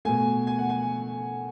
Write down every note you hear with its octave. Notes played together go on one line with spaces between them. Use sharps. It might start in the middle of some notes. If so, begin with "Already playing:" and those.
B2 A3 G#5
G#5
F#5
G#5